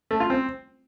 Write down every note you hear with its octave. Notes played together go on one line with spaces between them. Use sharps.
A3
F4
C4